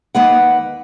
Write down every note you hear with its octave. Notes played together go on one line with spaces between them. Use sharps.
D#2 A#3 B4 F#5